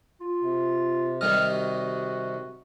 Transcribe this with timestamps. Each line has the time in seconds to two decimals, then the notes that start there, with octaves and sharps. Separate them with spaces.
0.21 F4
0.41 C3
1.21 D#3 G3 D#5 F6
1.52 F#4